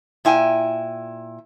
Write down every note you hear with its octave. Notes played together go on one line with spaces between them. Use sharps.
A#2 E4 G5 G#5